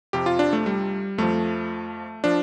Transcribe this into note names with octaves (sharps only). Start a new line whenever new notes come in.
F2 C3 F3 G4
F4
D4
A3
G3
F2 F3 A3
F3 D4